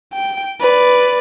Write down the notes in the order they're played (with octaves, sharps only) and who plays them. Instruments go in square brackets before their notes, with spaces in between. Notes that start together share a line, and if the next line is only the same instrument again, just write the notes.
[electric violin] G5
B4 D5